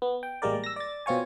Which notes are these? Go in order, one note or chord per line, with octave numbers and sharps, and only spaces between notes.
B3
G5
A1 G3 G#3 A#3 A#4 D5
E6 A#6
D5 A6
B2 C4 F4 C#5 G#5